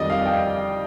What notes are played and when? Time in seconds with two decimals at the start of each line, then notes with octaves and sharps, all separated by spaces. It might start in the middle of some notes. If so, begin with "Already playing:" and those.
Already playing: F2 D#3 G3 D5 D#5
0.10 F5
0.25 G5